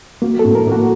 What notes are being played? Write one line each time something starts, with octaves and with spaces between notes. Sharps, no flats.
A#3 F#4
A4
A2
A#4
A#3 F#4